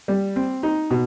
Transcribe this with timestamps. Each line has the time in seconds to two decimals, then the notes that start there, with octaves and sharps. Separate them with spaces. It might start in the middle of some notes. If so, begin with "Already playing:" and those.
0.08 G3
0.36 C4
0.63 D#4
0.91 B2